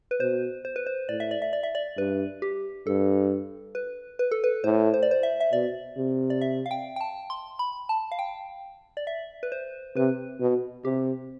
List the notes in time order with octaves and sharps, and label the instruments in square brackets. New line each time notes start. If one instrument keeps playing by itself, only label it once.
[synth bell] B4
[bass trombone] B2 [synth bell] C5
[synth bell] C5
B4
C5
[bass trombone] A2 [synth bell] D5
[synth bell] E5
D5
E5
D5
E5
D5
[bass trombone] G2 [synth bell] B4
[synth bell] G4
[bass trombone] G2 [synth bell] A4
[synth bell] B4
B4
A4
B4
[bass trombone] A2 [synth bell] C5
[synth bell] C5
D5
C5
E5
E5
[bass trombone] B2 [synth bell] D5
[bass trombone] C3
[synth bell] D5
E5
F5
G5
G5
A5
C6
B5
A5
F5
G5
D5
E5
B4
C5
[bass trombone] C3 [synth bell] B4
[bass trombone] B2
[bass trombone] C3 [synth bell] G4